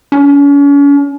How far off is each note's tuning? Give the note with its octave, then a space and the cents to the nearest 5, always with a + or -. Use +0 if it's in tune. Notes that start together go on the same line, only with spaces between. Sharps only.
C#4 +40